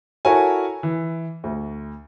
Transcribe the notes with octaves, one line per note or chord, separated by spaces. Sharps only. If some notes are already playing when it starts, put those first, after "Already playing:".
E4 F#4 A4 A#4 C#5 G#5
E3
D2